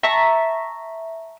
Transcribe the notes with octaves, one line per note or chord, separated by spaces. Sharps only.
E5 A5 A#5 C#6